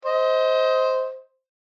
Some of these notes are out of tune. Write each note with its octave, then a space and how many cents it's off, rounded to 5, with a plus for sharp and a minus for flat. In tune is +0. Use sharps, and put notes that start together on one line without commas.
C5 -5 D#5 +25